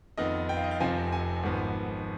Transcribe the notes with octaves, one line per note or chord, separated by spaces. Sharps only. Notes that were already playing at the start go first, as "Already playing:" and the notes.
F2 D#3 B3 D#5
G5
F5
D#5
F5
F1 F2 C3 F3 C4 G#5
G#5
G#1 G#2 F3 B3